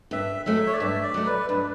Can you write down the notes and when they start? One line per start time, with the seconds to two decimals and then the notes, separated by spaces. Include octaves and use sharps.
0.11 G2 E5
0.46 F#3 A3 E5
0.66 C#5
0.73 D5
0.80 G2 E5
1.04 D5
1.14 F#3 A3
1.26 B4
1.49 G2 B4